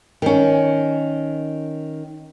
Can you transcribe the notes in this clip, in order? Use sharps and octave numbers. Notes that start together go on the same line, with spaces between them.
D#3 C#4